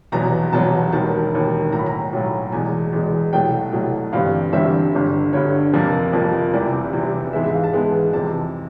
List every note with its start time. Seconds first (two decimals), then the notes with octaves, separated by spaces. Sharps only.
0.12 F1 E2 B2 F#3 B3 A#5
0.53 F1 E2 B2 F#3 B3 A5
0.92 E1 D#2 D#3 A5
1.32 E1 D#2 D#3
1.72 B1 A2 F#3 A#5
1.79 B5
1.86 A#5
2.13 B1 A2 F#3
2.52 E2 B2 G#3 G#5
2.93 E2 B2 G#3
3.33 C2 B2 F#3 A3 G5
3.73 C2 B2 F#3 A3
4.12 G1 G2 E3 G3 C4 F5
4.53 G1 G2 E3 G3 C4 E5
4.93 G1 G2 D3
5.33 G1 G2 D3 C#5
5.73 F2 C3 F3 A#3
6.13 F2 C3 F3 A#3
6.53 F1 E2 C3 E3 G3 D5
6.93 F1 E2 C3 E3 G3
7.33 G#2 E3 G#3 B3 E5
7.44 E5
7.54 F5
7.64 A5
7.73 G#2 E3 G#3 B3
8.13 F2 C3 E3 A5